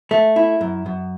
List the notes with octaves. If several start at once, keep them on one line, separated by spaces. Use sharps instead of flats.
A3
E4
F#2
F#2